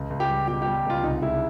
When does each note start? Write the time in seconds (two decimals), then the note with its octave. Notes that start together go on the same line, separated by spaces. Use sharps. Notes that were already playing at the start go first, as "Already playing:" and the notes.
Already playing: C#2
0.10 C#2
0.20 G4
0.29 G3
0.48 B2 G4
0.62 G4
0.66 G3
0.85 C#2 F4
1.03 C2 D#4
1.22 G#3 E4